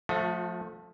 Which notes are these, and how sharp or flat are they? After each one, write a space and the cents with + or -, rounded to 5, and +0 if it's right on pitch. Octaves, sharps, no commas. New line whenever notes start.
F3 +25 A3 +0 F#4 -40